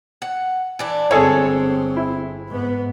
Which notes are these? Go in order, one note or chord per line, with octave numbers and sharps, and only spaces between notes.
F#5
E3 D4 E4
G1 G#3 C4 G#4 A4 C#5
E4
G#2 B3